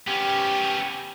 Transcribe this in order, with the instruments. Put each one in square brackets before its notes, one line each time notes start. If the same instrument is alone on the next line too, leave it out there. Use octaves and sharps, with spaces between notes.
[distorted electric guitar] B3 C#4 [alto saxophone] G4